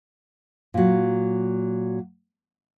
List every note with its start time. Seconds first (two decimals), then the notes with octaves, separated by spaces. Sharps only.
0.74 A#2 F#3